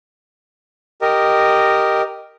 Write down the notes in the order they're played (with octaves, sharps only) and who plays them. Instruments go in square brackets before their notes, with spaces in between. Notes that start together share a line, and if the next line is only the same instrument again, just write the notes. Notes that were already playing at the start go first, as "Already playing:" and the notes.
[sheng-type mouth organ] G4 A#4 D#5